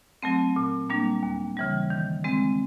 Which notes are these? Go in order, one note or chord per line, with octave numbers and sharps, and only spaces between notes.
F#3 A3 C4
A#2
G3 A#3 D4
D#2
C#3 E3 G3
D#3
G#3 C4